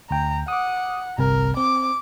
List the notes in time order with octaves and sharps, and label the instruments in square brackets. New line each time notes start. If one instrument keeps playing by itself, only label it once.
[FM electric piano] D2 G5 [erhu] A#5
[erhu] F#5 [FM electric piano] D6 D#6
[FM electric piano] G1 C2 C3 [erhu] A#4
[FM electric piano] C4 [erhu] D6